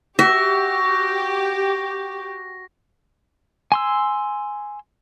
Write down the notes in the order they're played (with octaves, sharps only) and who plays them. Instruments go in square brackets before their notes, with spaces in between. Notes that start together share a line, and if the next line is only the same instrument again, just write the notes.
[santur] F#4 [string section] G4 [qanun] E5 [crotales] A#6
[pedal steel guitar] G#5 C6 E6